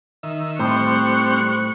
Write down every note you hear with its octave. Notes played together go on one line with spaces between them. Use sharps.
D#3 E5
A2 G3 C4 C5 C#6 F#6